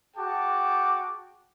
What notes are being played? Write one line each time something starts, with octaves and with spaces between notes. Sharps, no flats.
F#4 G#4 G5 A5 D6